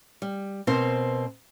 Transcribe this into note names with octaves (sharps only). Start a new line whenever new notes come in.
G3
B2 C4 A#4 C5